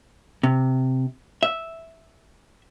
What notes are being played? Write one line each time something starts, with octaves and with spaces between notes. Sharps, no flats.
C3
E5